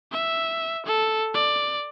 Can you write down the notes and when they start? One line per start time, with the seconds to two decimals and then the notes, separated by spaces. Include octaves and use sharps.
0.12 E5
0.86 A4
1.34 D5